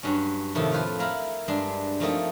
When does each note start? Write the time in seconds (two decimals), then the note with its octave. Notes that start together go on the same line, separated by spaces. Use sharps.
0.03 G2 F#3 C#4
0.55 F2 A2 C3 D#3 A5
0.72 F4 B4 C5
0.99 E4 A#4 F5 B5
1.48 G2 G#3 D4 C6
2.00 F3 A3 A#3 C4 D#4 F4